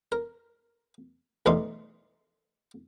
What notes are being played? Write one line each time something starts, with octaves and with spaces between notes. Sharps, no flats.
A#4
B1 E2 G2 A3 D#4 C6